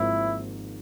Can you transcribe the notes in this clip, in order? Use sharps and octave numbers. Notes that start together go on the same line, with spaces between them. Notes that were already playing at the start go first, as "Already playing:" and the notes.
Already playing: G#1 G#2 F3 A#3 E4